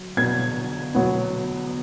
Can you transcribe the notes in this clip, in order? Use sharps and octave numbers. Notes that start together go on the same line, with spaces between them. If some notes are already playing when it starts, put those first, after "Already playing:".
Already playing: F#3
B2 F#3 B3 G#6
B2 F#3 B3